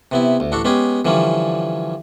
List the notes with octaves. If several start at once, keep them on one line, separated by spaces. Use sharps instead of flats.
C3 B3 E4
D2
A1 D4 F#4 A4
G#3 B3 C#4 G4 G#4
D3 E3 F3 G3 C#4